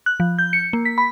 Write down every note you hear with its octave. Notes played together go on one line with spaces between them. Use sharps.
F#6
F3
G6
C#7
A#3
B6
B5